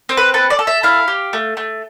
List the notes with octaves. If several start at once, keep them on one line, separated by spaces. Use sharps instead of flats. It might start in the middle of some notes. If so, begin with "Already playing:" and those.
C4
B4
A4 B4
D5
A4
E5
E4 F5
G4
A3
A3